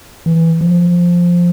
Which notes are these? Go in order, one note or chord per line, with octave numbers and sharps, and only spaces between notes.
E3
F3